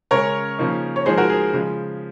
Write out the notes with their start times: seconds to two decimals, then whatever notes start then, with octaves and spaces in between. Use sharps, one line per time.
0.11 C#3 G#3 C#4 A#4 C#5
0.58 C#3 F3 A#3 D#4
0.96 C#5
1.06 F3 G#3 D#4 G#4 C5
1.18 F#4 A#4
1.29 G#4
1.53 C#3 F3 G#3